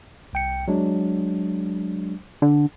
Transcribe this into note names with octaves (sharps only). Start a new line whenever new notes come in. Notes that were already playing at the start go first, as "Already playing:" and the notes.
C2 G5 C#7
F#3 G#3 D4
D3